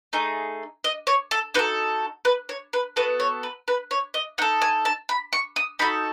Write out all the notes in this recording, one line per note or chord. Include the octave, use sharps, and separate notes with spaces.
A3 D#4 G#4
D#5
C#5
A4
D#4 F#4 A4 B4
B4
C#5
B4
B3 F#4 A4 B4
C#5
B4
B4
C#5
D#5
D#4 A4 F#5
G#5
A5
B5
C#6
D#6
D#4 F#4 A4 B5